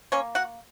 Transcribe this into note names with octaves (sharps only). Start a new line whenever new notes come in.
A#3 C#4 C#5
F#4 F#5